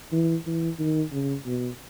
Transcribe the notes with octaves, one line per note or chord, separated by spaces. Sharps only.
E3
E3
D#3
C#3
B2